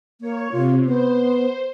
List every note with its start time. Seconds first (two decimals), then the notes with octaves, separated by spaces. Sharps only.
0.21 A#3 C#5
0.52 C3 F4
0.85 B3 C5